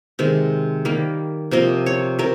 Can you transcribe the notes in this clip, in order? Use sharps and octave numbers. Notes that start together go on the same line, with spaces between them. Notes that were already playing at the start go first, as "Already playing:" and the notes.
C3 D#3 G#3
D#3 G3 A#3
C3 F3 A#3 D#5
C#5
C3 A#4